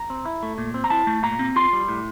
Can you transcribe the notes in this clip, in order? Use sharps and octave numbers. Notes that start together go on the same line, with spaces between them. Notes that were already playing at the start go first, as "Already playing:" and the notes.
Already playing: A#5
C4
E4
A3
A#2
C4
A#5
E4 A5
A3
A#2 A#5
C4
F4 C6
G3
A2